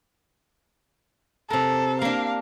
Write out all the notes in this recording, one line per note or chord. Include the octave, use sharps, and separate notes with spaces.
C3 A4 A#4
A#3 D4 F5